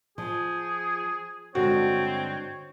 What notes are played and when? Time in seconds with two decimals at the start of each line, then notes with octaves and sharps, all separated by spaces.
0.18 F3 G#4
1.55 G2 D3 G#3 C4 F#4 C#5